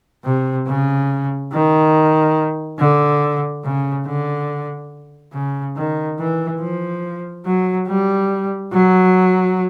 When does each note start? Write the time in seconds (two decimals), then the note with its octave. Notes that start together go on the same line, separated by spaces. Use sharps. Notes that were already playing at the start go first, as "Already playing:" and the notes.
0.25 C3
0.67 C#3
1.52 D#3
2.79 D3
3.64 C#3
4.06 D3
5.33 C#3
5.76 D#3
6.19 E3
6.61 F3
7.45 F#3
7.87 G3
8.72 F#3